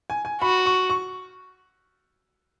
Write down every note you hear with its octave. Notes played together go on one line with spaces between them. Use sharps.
G#5
G#5
F#4 B5
C#6
C#6